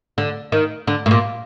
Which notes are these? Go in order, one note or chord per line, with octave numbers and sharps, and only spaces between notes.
D3
D#3
D3
A2
A#2